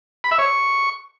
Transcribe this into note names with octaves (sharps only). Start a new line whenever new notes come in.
B5
E5
C#5
C#6